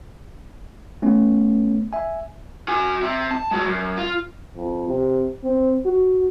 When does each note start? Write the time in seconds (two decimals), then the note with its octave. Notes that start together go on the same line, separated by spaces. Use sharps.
1.02 A3 B3 C#4
1.93 E5 G#5
2.68 F#4 G#5
3.03 C4 E5
3.31 A5
3.51 G#3 F#4
3.65 F#2
3.98 F4
4.56 F2
4.88 C3
5.43 C4
5.85 F#4